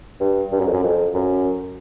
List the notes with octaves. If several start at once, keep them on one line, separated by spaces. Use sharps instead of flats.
G2
G2
F#2
F2
F#2
F2
F#2